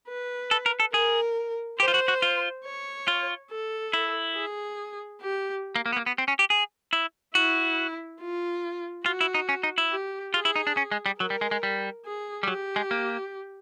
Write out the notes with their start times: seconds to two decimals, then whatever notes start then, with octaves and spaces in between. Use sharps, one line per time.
0.08 B4
0.51 A4
0.66 A#4
0.80 A4
0.94 G#4 A#4
1.80 G4 C5
1.88 F4
1.94 F#4
2.08 F#4
2.22 F4
2.65 C#5
3.08 F4
3.50 A4
3.93 E4
4.36 G#4
5.22 G4
5.76 A#3
5.86 A#3
5.92 B3
5.96 A#3
6.06 B3
6.18 C4
6.28 C#4
6.39 G4
6.50 G#4
6.93 E4
7.35 E4 F#4
8.21 F4
9.06 F4 F#4
9.21 E4
9.34 D#4
9.49 C#4
9.63 D#4
9.78 E4
9.91 G4
10.34 F4 G#4
10.45 E4
10.56 D#4
10.67 D4
10.77 C#4
10.92 G#3
11.06 G3
11.20 F#3 A#4
11.30 G3
11.41 G#3
11.51 G#3
11.63 G3
12.05 G#4
12.43 G3
12.48 F#3 G4
12.76 G#3
12.91 A#3